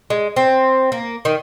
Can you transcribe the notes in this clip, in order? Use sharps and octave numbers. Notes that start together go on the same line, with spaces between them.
G#3
C4
A#3
D#3